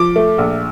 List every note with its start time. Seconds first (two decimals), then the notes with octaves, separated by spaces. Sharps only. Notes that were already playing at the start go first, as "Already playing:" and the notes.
Already playing: F3 D6
0.16 A3
0.38 A#1